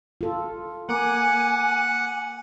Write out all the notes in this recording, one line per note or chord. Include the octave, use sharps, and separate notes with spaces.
F4 A4
A#3 F#5 G#5 D6